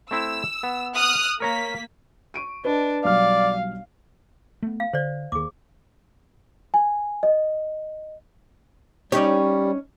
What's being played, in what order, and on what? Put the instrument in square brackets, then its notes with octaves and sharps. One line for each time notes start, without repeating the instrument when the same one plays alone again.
[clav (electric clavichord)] A3 C4 E4 [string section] E6
[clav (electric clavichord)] B3
[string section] D#6 F6 F#6
[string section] A#3 B6 [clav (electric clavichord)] A#4 C#5 A#5
[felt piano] C#6 D7 D#7
[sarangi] D4 [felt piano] B4 D#5
[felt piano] B1 G3 F6 [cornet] D5 [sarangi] F5
[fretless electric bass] A3 B3
[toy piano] F5
[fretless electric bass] D3 [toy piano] C5 D5
[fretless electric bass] D#2 D#3 [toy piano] G#4 D6
[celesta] G#5
D#5
[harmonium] G3 [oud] C#4 D#4 C#5 [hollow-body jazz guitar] G4 D5